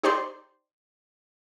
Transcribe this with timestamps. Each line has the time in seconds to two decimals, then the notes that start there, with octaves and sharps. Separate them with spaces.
0.03 D#4 G4 C5 D5 C6